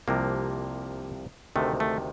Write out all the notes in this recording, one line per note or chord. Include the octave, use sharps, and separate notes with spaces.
C2 C3 F3 A#3
D2 C3 D#3 A3
A3